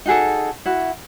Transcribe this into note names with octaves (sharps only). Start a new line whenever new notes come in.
D#4 F#4 G#4 A4
E4 F#4